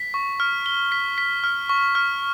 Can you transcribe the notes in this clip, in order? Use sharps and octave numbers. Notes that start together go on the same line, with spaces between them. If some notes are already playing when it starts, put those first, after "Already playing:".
Already playing: B6
C#6
F6
G7
B6
B6
F6
C#6
F6